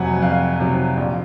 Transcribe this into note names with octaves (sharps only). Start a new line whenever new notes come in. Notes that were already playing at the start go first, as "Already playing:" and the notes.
Already playing: F2 C3 F#3 F#5 G#5
F2 F5
C3 F#3
A#1